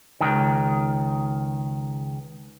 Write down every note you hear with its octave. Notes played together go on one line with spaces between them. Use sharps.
C#2 G2 D#3